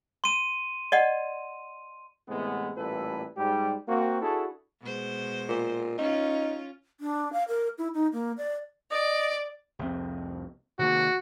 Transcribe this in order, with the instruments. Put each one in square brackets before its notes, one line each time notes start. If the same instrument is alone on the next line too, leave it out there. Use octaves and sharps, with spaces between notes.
[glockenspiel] C6 D#7
[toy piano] D5 D#5 F#5
[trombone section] A2 C3 E3 G#3 B3
A1 A#2 G3 E4 A4 B4
G#2 G3 G4
A#3 C4 F#4
D4 E4 F#4 G#4 A4
[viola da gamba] B2 G#3 C5
[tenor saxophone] A#2
[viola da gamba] C#4 F4 [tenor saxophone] D#4
[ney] D4
F5
A#4
E4
D#4
A#3
D5
[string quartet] D5 [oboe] D#5
[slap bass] C2 F2 C4
[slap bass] C3 D#3 A#3 [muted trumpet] F#4